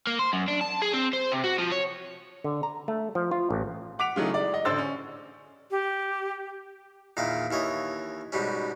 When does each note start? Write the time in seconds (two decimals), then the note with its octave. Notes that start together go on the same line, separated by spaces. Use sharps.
0.07 A#3
0.19 C5
0.33 F#2
0.48 D4
0.61 A5
0.82 G#4
0.94 C4
1.13 C5
1.32 C3
1.44 F#4
1.59 F3
1.72 C#5
2.44 D3
2.63 A#5
2.88 A3
3.15 F3
3.31 F4
3.51 A1
3.99 F#5 D6 B6 D7 F7
4.16 C#3 E3 F#3 A3 D#4 G#4
4.34 G#3 D5
4.54 D#5
4.65 A1 D3 D4 C5 E6 A6
4.78 C#4
5.71 G4
7.17 E2 A#2 D#3 F5
7.51 D#2 E3 C#5 D#5
8.32 G#2 B2 G3 C#4